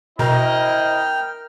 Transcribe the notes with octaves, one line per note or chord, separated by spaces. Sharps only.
B2 C4 E4 A#4 D#5 G5 F6